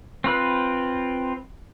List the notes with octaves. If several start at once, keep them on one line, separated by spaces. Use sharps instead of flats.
C4 F4 B4